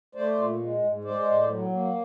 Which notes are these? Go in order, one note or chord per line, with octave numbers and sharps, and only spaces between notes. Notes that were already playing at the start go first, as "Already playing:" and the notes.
A3 C5 D5
A#2
G#3
G#2
G#3 C5 D5
A2
F#3
A#3